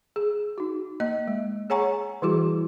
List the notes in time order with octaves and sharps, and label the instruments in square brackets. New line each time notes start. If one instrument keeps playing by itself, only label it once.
[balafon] G#4
D#4 F#4
A#3 D#5
G#3
G#4 C#5 F#5 G#5 A#5 C#6
E3 G3 E4 F#4 G#4 D6